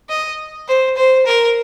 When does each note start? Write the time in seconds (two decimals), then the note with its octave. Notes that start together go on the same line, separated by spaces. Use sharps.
0.09 D#5
0.68 C5
0.97 C5
1.26 A#4